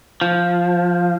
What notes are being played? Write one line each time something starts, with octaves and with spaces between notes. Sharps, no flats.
F3